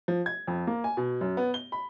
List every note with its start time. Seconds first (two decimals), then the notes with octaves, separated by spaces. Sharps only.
0.08 F3
0.26 G#6
0.48 F2
0.67 A#3
0.84 G#5
0.97 B2
1.21 F#2
1.37 B3
1.54 G7
1.72 B5